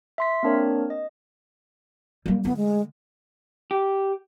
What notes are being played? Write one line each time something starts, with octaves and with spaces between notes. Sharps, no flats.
E5 C6 B6
A#3 C4 D4 A#4 C#5
D#5
G3 A#3
D3 A3 B3
G#3
G4